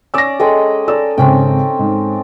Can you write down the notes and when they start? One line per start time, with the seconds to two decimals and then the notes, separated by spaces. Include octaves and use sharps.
0.14 C#4 D5 E6 A#6
0.40 G#3 A4 D#5 G5
0.88 A4 A#4 D5 E6
1.18 G#1 C#3 C4 C#4 G5
1.79 G#2